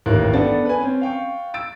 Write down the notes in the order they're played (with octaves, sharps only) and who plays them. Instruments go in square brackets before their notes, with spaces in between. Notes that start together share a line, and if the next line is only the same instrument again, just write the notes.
[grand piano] A1 D#2 A#3 A#4 F#6
B3 D4 A4 A6
B4 G#5
C4 C#4
F5 G5 C#6
E6 A6 D7